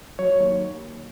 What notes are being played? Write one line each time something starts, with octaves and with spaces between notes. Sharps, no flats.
F#3 C#5
D#2